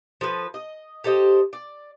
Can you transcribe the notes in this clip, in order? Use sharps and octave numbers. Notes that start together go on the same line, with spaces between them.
F3 A4 B4
D#5
G4 A4 C5 D#5
D5